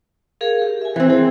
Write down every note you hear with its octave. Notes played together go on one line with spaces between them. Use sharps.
G#4 A#4 F5
G4
E5 G#5
E3 C4
C4 G#4